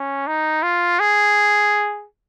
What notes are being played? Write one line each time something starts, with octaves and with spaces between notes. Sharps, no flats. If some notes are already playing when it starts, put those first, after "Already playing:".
Already playing: C#4
D#4
F4
G#4